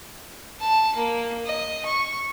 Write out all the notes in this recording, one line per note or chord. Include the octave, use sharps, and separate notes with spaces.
A5
A#3
D#5
C#6